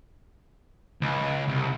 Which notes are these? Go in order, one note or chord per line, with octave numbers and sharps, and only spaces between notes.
C#2
C2